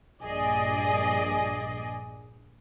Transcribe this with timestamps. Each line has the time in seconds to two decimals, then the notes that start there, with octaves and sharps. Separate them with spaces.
0.21 A#1 G2 G#4 D5 D#5